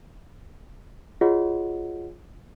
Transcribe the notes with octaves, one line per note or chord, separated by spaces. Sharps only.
F4 F#4 G#4 C#5 D#5 F#5